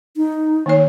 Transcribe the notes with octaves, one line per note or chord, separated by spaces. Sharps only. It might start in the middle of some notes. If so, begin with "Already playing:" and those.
D#4
D#3 A#3 C#5